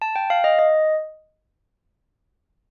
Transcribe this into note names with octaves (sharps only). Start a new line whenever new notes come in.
A5
G5
F5
D#5
D#5